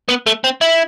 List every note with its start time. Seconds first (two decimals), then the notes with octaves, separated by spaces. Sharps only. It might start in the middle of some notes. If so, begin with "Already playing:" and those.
0.09 B3
0.27 A3
0.44 C4
0.61 E4